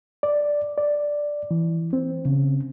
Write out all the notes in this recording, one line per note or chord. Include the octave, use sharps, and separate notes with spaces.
D5
D5
E3
C4
C#3